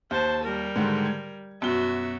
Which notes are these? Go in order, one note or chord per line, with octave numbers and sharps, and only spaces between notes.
D#2 C5 A5
G3 A#4
G#2 D3 D#3
G#6
F#2 B2 F#4 E5 G7